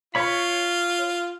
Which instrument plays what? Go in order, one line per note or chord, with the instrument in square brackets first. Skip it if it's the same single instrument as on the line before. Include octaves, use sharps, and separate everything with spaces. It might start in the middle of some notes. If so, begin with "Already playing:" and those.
[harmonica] F4 [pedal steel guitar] C#5 B5